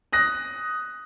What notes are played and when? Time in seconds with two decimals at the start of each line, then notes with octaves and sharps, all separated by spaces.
0.13 D#6 F#6 A#6